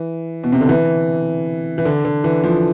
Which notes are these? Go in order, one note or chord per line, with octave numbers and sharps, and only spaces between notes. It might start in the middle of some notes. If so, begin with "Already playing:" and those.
Already playing: E3
B2
C3
D3
E3
E3
D3
D3
E3
F3